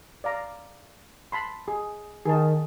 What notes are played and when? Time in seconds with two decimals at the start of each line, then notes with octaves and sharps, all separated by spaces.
0.24 D5 F5 A#5
1.32 A5 B5 C6
1.68 G#4
2.26 D#3 G#4 A5